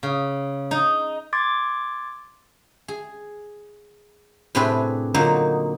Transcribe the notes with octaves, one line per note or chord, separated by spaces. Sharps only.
C#3
D#4
C6 D6 G#6 A6
G#4
A2 C3 C4 D4 G#4 B4
A#2 D3 F#3 A#3 D#4